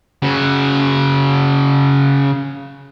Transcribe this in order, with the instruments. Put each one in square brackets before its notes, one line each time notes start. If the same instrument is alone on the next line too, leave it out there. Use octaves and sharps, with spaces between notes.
[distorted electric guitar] C#3 F#4